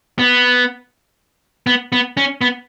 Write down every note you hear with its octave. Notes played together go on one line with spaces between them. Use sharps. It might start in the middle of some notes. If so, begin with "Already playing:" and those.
B3
B3
B3
C#4
B3